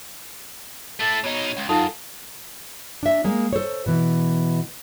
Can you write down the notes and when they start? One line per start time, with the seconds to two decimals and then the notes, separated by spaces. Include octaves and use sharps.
1.00 A3 E4 A4
1.24 B2 D#4 C#5
1.57 C#2
1.69 F#2 D#4 F4 A4 A5
3.03 D4 E5
3.24 G#3 A#3
3.53 A4 C5 C#5
3.86 B2 E3